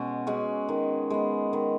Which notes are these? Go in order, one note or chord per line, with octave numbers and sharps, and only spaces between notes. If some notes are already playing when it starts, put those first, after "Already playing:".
Already playing: B2 G#3 C#4 F#4
G#3 C#4 F#4
D#3
G#3 B3
D#3